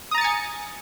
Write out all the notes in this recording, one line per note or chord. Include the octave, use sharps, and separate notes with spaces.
G#5 A#5 D#6 A6 C#7